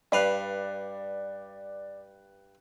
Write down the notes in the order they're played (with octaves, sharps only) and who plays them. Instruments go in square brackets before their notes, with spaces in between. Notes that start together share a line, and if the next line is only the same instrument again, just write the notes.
[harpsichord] G2 B4 F5 [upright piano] D5 F#6